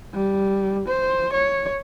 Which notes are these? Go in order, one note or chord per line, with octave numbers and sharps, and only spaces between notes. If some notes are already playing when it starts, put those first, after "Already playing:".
G3
C5
C#5